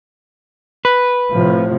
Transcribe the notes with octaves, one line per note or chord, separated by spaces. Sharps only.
B4
A2 C3 F3